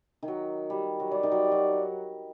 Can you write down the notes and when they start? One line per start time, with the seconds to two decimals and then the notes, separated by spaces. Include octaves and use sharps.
0.22 D#3
0.28 F#3
0.70 G3
1.00 F#3
1.11 G3 D5
1.23 D#3
1.32 F#3
1.52 F#3